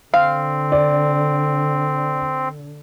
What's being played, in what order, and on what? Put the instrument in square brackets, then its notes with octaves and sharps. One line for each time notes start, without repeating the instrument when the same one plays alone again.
[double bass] D3 [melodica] C4 [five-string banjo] F5
[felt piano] D5